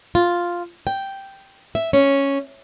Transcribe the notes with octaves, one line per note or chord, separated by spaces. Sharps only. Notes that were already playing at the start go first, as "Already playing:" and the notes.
F4
G5
E5
C#4